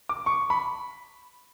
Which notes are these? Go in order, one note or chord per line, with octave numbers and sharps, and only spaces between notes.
D6
C#6
B5